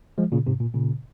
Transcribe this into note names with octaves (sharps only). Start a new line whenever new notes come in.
F3 G#3
A#2 C#3
G#2 C3
A#2
A#2 C#3